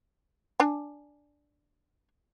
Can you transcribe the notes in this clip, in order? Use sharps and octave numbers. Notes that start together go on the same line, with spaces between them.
D4 G#5